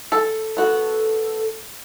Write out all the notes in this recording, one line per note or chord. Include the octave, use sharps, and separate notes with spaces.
A4
B3 F#4 A4